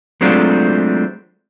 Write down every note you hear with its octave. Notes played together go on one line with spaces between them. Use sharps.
F#3 G#3 A3 C4 D4 F4